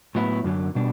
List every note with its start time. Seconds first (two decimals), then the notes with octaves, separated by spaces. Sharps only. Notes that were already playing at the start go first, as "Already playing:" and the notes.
0.15 A2 F#3 B3 E4
0.44 F#2 D3 F#3
0.75 B2 G3 D4